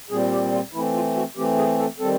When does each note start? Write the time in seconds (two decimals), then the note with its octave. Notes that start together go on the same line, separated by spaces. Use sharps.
0.10 A#2 G3 C4 G#4
0.32 G4
0.53 F4
0.73 E3 A3 C4 E4
0.94 F4
1.16 F#4
1.36 E3 A3 C4 G4
1.57 G#4
1.79 A4
1.99 D#3 G3 C4 A4